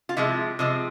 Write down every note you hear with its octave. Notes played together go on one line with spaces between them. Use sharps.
F4
C3 F3 G#3 E4
C3 F3 G#3